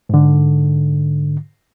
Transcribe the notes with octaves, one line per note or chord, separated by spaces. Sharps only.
G#2 D3